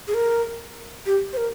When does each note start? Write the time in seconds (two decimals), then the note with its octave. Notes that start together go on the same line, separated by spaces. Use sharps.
0.08 G#4
0.14 A#4
1.06 G4
1.33 C5
1.37 A#4